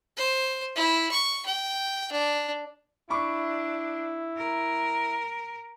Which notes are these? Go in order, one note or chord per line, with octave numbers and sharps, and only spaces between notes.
C5
E4
C#6
G5
D4
D4 E4 B5 C#6 D6
A#4